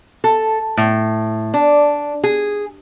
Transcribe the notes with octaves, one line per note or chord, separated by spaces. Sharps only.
A4
A2
D4
G#4